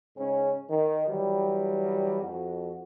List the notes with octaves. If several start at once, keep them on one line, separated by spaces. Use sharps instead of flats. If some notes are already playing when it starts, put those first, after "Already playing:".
G#2 C#3 C#4
D#3
E3 F#3 G3
F2 F#4